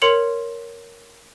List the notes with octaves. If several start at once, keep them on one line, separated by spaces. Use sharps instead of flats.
A#4 C#5 C6 C#7 F7 F#7